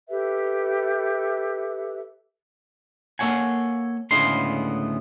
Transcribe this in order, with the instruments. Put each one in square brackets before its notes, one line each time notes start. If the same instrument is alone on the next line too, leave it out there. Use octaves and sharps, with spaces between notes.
[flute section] G4 A4 B4 E5
[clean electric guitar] A#3 A4 C#5 F#5 G#5
D2 A2 C#3 G#3 B3 C6